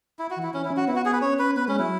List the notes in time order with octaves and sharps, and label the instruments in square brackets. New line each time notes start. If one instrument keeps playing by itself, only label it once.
[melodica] E4
F#4
[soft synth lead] E3
[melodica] E4
[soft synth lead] E3 [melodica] C#4
[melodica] E4
[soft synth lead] C#4
[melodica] F#4
[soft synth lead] B3 [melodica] E4
[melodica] F#4
G#4
B4
[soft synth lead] C#4 [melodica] C#5
[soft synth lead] C#4 [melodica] B4
[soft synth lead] B3 [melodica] B4
[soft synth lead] G#3 [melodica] C#4
[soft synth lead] F#3 [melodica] E4